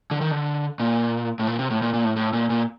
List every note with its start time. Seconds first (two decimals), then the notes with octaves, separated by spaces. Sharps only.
0.11 D3
0.21 D#3
0.31 D3
0.80 A#2
1.39 A2
1.47 A#2
1.59 C3
1.70 A2
1.82 A#2
1.93 A#2
2.04 A2
2.16 A2
2.33 A#2
2.50 A#2